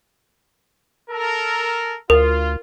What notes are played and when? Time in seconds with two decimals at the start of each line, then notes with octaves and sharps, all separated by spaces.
1.09 A4 A#4
2.10 D2 F4 A#4